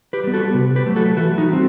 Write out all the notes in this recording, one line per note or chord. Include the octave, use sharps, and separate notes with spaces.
G4 B4
G3 B3
F#4 A4
C3
G4 B4
F#3 A3
F#4 A4
E3 F#4 A4
D#4 F#4
G3 C4